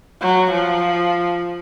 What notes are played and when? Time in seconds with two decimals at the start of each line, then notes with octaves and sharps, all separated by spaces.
0.21 F#3
0.50 F3